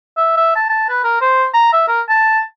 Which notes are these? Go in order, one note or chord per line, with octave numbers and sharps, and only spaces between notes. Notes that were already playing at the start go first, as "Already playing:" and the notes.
E5
E5
A5
A5
B4
A#4
C5
A#5
E5
A#4
A5